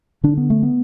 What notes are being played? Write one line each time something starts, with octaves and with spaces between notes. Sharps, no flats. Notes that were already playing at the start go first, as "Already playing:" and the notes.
D3 D4
B3
A3
B3